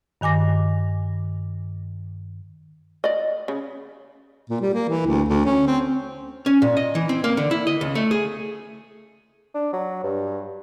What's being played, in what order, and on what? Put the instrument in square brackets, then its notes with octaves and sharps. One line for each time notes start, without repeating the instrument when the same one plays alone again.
[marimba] G2 D#3 G#5 D6 A#6
[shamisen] D5 D#5
C#3
[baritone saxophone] A#2
G3
A#3
E3
D2
D2
C#4
C4
[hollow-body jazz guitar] C#4
A#2
D#5
E3
C4
A#3
D3
E4
D#5
C#2
A3
G#4
[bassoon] D4
F#3
G2